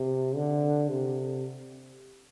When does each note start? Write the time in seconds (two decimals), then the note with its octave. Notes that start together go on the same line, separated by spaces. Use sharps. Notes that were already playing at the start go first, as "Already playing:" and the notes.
Already playing: C3
0.36 D3
0.89 C3